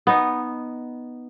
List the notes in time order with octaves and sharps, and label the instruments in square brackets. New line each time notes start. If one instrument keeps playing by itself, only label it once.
[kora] B3 D#4